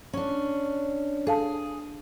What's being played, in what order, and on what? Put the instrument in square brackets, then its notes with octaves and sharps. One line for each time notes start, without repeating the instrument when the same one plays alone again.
[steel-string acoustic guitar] C#4 D4
[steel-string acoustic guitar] G#4 [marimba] A4 F5 A5